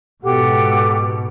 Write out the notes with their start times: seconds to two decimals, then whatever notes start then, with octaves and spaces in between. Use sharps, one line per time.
0.22 G#2 B2 G4 A4 F#5